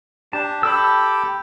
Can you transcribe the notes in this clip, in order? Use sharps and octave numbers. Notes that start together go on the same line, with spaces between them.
D4 G4 A5
G4 A4 G5 B5 E6